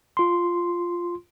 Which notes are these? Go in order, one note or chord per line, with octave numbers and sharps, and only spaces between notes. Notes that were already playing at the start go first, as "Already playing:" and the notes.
F4 C6